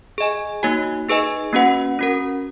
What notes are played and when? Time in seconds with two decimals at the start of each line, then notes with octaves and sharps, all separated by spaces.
0.18 G#4 D#5 G#5
0.63 A#3 D#4 F#4 C#5 G#5
1.09 D#4 G#4 B4 D#5 G#5
1.53 A#3 C#4 F#4 B4 F#5
1.99 C#4 F#4 A#4